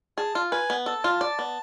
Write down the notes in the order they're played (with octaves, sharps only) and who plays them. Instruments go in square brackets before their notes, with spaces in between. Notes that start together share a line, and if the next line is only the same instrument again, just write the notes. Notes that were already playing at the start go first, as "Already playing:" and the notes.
[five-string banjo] G#4 [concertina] A5
[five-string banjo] F4
[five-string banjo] B4 [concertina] G#5
[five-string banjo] B3
[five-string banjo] A4 [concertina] A5
[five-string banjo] F4
D5
B3